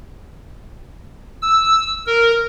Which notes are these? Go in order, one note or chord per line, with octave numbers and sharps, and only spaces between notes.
E6
A#4